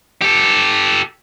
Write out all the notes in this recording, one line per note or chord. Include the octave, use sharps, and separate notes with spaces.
G4 A4